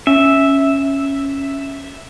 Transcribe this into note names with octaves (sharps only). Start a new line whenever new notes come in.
C#4 E5